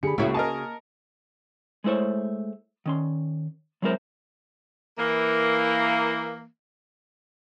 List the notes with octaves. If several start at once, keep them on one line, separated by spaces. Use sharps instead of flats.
D3 G4 G#4 B5 C#7
C#2 C#3 A#3 E4 F#4 C#5 E5
A#4 D#5 G#5 A5 D#6
G#3 A3 E4 C5 C#5
D#3 C#4 C6
F#3 G#3 C4 E4 A#4 C5
E3 A#3